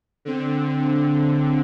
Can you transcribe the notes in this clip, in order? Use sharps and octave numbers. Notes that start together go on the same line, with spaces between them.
D3 C4